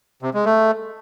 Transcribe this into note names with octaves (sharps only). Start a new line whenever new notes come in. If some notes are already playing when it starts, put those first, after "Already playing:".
C3
G#3
A3